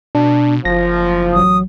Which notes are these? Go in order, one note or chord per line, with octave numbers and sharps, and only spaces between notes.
B2 D4
F#1 F3 A#6
A1 F#3 D#6